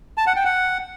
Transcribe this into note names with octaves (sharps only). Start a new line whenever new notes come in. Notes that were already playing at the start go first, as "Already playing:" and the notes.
A5
F#5
G5
F#5